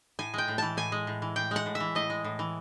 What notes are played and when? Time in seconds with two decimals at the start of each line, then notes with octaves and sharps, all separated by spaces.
0.19 A2 G#5
0.34 G#3 G5
0.48 A2
0.58 E3 A5
0.77 A2 G#5
0.92 G#3
1.07 A2
1.22 E3
1.36 A2 G5
1.51 G#3 F#5
1.66 A2
1.75 E5
1.80 E3
1.95 A2 D#5
2.10 G#3
2.24 A2
2.39 E3